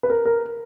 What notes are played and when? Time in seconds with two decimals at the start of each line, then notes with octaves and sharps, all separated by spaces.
0.03 B4
0.10 A#4
0.25 A#4